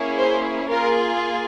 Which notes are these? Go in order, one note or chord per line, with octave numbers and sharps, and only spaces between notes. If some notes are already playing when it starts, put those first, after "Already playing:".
Already playing: A#3 C#4 E4 G#4
C5
A#3 F4 G#4 A#4